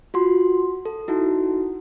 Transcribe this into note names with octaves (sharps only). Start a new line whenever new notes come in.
F4 F#4 C6
A4
D#4 E4 F#4